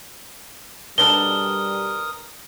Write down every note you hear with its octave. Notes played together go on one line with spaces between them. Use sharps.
B2 G3 D4 A4 A#4 D#6 G7